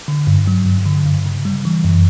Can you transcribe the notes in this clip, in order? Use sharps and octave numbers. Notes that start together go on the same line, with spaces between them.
D3
G2
F#3
G2
D3
G2
C#3
G3
E3
F#2